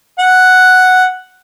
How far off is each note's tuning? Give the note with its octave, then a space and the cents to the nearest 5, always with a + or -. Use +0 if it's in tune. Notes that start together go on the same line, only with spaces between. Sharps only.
F#5 +0